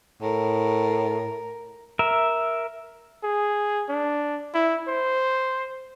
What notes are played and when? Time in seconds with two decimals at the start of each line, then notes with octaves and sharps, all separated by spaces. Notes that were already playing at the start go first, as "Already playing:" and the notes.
0.22 A2 A#4
1.99 A#4 E5
3.23 G#4
3.89 D4
4.54 E4
4.88 C5